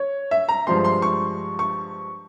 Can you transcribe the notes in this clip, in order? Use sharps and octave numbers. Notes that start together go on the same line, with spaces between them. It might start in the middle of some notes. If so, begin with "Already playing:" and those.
Already playing: C#5
E5
A#5
G2 F3 G#3 C6
C6
C#6
C#6